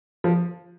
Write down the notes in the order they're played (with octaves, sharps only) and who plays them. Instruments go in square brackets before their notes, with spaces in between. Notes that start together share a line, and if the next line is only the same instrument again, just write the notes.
[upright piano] F3